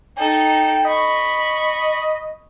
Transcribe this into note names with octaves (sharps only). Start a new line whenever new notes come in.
D#4 A4 G5
D#5 B5 C#6